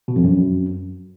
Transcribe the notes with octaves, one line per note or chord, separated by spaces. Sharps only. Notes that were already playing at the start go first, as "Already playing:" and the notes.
B2
F2
F#2